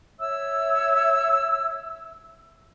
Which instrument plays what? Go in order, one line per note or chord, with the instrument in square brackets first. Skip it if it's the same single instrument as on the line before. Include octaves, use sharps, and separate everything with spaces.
[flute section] C#5 E5 E6